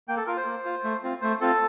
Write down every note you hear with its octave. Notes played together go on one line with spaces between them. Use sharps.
A#3 G5
A4
F4 A#4
C5
A#3
F4
A3
C4 F4
A3 C5
C4 F4 A4